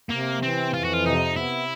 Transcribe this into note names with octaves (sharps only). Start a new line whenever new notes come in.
C3 A#3
E3 C4
F2 F4
F#4
F4
C3 D#4
B3 E4